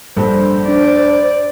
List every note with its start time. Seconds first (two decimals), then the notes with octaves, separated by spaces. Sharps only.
0.17 A#1 G2 G3 A4 C5
0.68 D4 D5